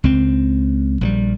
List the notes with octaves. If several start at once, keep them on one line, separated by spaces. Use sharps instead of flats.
C#2 C4
A#1 F3 G3